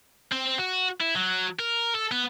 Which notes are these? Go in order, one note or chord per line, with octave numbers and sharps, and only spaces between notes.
C4
F#4
E4
F#3
A#4
A4
B3